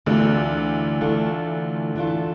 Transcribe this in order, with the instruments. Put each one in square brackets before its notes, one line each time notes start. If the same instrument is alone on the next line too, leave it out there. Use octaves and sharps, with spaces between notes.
[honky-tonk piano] D2 D3 [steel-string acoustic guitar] E3 A3 D4 F4 A4
[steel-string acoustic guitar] E3 A3 D4 F4 A4
E3 A3 D4 F4 A4